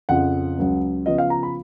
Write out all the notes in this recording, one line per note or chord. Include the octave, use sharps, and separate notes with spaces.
F2 C#3 F3 F#5
C#2 C#3 F#3
C#3 F3 B3 F4 D#5
F5
A#5
B5